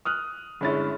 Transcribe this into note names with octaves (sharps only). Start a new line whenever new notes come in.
D#6 F6 F#6
G1 G#3 C#4 E4 A6